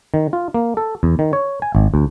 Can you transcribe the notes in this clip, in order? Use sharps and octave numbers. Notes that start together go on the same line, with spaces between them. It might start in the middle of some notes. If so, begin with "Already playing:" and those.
D#3
F4
A#3
A4
E2
D#3
C#5
G#5
G#1
D2